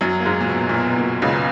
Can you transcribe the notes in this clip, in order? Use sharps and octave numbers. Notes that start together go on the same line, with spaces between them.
F#2 F#3
A#3
G#2 G#3
A#2
B2
A#2
B2
B2
A#2
C#2 C#3